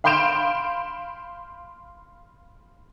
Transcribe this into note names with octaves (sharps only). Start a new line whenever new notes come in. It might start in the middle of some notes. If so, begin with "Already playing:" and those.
F5 B5 C6 G6 D7 E7